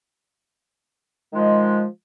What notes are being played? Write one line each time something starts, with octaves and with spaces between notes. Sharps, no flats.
D#3 F3 G#3